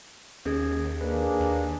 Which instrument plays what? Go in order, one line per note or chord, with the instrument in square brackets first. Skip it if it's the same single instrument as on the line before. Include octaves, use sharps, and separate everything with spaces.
[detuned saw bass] D#2 [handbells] C#4 G#4 G#6
[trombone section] A#3 D4 G#4 [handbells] B4
[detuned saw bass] D#2